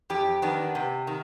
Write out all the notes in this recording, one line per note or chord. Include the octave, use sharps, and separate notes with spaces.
F2 G4
D#3 B3 D4
C3
D#3